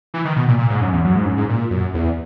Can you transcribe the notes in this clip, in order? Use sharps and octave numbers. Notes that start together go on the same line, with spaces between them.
E3
D#3
B2
A#2
A#2
G#2
F#2
E2
F#2
G#2
F#2
G#2
A#2
F#2
E2